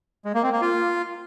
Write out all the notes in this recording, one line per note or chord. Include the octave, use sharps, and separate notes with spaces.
G#3
A#3
C4
A#3
F4